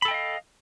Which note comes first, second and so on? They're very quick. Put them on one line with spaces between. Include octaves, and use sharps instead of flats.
B5 A4 G5 D#5 F5